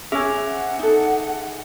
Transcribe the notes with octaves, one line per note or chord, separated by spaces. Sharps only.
C#4 G#4 E5 G#5
F#5
D#4 A4